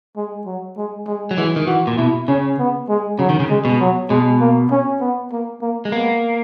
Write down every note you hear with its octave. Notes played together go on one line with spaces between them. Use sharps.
G#3
F#3
G#3
G#3
F#3
E3 G#3
D#3
E3 F#4
A#2
B2 E4
C#3 C#4
B3
G#3
C#3 F#3
D#3
C#3
G#3
B2
F#3
B2 G#3
A#3
C#4
B3
A#3
A#3
G#3
A#3 B3